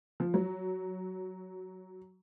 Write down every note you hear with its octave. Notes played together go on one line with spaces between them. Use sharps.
F3
F#3